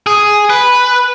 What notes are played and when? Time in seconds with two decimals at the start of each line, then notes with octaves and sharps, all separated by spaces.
0.07 G#4
0.50 B4